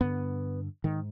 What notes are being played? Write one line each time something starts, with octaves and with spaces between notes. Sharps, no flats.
G2 D3 B3
G#2 D#3